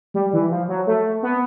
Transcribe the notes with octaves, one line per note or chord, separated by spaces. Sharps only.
G3
E3
F3
F#3
A3
B3